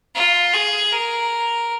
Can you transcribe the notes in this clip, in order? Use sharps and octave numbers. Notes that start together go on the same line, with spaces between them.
F4
G#4
A#4